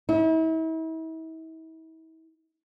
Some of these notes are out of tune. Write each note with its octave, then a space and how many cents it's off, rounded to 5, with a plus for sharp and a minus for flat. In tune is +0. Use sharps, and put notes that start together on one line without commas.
E4 -40